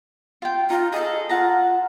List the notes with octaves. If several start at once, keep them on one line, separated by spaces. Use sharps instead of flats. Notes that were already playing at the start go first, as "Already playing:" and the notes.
F4 G5
D#4 F4
G#4 A4 D#5
F4 F#5 A5 A#5